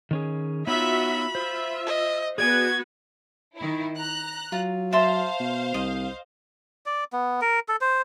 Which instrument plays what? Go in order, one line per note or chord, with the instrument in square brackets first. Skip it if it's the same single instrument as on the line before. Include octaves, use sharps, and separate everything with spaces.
[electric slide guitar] D#3 C#4 G#4
[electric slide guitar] B3 D#4 C#5 [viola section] F4 F#4 E5 [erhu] B5
[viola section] F4 E5 [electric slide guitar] C5
[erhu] D#5
[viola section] B3 F#4 B4 [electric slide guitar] G#4 D5 G#5 [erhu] G#6
[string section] D#3 E4
A#5 F#6
[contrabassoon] F#3 [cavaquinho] F4
[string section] C5 F5 [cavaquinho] E5 A5 C6
[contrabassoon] B2
[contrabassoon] C2 [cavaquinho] D#5
[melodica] D5
B3
A#4
A4
C5